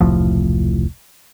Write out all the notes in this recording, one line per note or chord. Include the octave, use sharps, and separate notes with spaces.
E1 C2 A2 F3